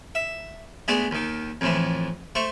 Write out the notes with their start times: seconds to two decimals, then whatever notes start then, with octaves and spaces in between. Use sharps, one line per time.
0.15 E5
0.88 G#3 A3 B3 D4
1.11 D#2 D#3
1.61 F2 A2 E3
2.35 A3 C5 C#6